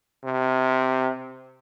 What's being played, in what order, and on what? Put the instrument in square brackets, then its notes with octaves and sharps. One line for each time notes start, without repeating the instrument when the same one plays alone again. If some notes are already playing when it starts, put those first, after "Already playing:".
[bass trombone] C3